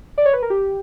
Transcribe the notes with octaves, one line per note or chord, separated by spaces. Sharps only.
D5
C#5
B4
A#4
G4